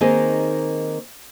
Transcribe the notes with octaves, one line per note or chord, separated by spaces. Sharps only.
D#3 A#3 C4 D#4 G#4